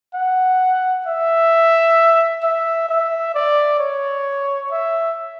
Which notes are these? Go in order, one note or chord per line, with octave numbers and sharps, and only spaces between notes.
F#5
E5
E5
E5
D5
C#5
E5